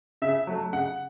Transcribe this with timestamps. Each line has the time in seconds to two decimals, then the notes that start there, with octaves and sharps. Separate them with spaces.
0.22 C#3 E5
0.47 F#3 A3
0.73 C#3 F#5